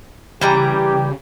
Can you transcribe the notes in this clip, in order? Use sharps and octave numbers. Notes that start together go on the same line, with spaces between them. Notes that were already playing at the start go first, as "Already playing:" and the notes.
C#3 E3 G3 G4 A#5